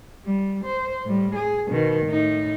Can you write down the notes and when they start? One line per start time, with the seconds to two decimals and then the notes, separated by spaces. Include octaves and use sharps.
0.25 G3
0.65 C5
1.05 A2 G3
1.35 G#4
1.68 B2 D#3
2.06 A2 D#4